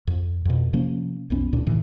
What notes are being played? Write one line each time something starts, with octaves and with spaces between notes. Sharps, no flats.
F2
F2 B2
C3 F3 A#3 C#4
B1 F2 B3 C#4
C#2 A#2 D4
A2 C3 D#3 E3